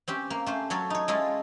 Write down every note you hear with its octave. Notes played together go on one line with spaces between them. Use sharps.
C4 C#4 G4
A#3
A3 C#4 C5
F#3 C#4 A4 C#5
D#4 C#5
G#3 C#4 E4 F4 A4